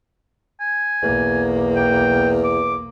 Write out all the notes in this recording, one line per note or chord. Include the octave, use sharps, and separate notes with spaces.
G#5
B1 E2 A#3
G5
D6